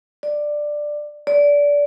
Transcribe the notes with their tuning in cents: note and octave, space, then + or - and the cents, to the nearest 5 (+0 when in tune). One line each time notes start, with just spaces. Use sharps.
D5 +10
D5 -20